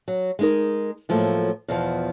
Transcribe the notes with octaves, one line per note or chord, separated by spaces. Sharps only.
F#3
G#3 D#4 A#4
A2 F3 F#3 A3 A#3
E2 B2 F3